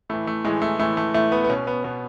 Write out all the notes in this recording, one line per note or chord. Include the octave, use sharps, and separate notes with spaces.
A2 E3 A3
A3
A2 E3 G#3
A3
A2 E3 A3
A3
A2 E3 A3
B3
B3
B2 C#4
B3
B2 B3